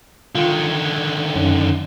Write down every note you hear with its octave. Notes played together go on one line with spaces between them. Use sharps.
D3 D#3 F4
G#6
F#2 C#4 D#4